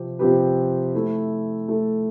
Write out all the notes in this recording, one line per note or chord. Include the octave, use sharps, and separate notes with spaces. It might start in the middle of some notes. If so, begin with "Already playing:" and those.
Already playing: C3 F3 C4 G4
C3 F3 C4 G4 B4
A3 E4 A4
A3 E4 A4